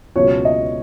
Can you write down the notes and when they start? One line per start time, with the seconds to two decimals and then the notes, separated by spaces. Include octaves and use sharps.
0.15 C#2 B2 F#3 C#5
0.45 D#5